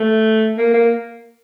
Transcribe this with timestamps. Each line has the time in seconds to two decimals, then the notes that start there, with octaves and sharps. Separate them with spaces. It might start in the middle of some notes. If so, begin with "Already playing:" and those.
Already playing: A3
0.57 A#3
0.74 A#3